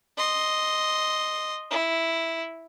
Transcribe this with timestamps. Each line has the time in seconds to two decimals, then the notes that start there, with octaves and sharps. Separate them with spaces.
0.17 D#5 C6
1.70 E4